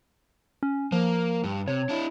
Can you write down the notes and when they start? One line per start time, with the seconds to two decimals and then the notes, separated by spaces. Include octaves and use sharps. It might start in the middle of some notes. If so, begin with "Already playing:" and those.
0.63 C#4
0.92 F3 A#3
1.44 G2
1.68 C3 C#5
1.89 D4 E4